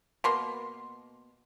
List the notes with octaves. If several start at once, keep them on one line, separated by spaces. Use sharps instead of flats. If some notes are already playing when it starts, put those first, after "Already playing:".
B2 A#3 C6